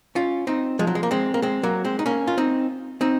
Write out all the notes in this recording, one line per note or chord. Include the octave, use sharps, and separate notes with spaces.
C#4 F4
C4 D#4
F3 G#3
F#3
G#3
A#3
G#3 C4
A#3
G#3 C4
F#3 A#3
G#3 C4
D#4
A#3 C#4
F4
C4 D#4
C4 D#4